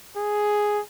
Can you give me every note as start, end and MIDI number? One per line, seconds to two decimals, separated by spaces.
0.17 0.80 68